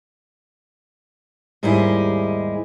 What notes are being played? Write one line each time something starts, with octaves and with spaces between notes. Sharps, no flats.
D#2 G#2 G3 D#4 E4 G#4